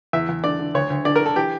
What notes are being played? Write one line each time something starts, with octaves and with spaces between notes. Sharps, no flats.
E2 E5
E2
D3 D5
D3
D2 C#5
D2
D3 D5
A#4
D3
A4
E3 G4